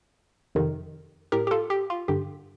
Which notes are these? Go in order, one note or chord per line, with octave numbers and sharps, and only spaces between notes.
F2 C3 D#3
A2 G4 A#4
G4
F4 A4
G4
F4
G2 D3 G4